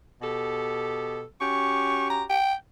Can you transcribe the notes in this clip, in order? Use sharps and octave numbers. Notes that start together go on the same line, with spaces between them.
B2 G4 A4
C#4 F#4 G4 C#6
A#5
G5